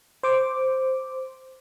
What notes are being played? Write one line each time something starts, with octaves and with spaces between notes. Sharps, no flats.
C5 D6